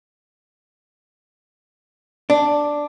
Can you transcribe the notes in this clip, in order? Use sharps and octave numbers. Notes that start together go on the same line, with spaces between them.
D4